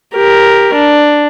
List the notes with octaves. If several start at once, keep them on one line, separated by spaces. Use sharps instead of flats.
G4 A#4
D4